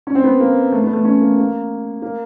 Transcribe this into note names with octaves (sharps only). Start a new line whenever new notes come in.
C#4
C4
B3
A#3
A3
B3
A3
C#4
A#3
A#3
A#3